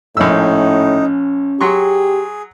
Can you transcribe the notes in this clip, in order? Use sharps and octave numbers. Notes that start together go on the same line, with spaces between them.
A#1 A2 C#4 D#4 E5 E6
F#3 G4 G#4 C6 C#6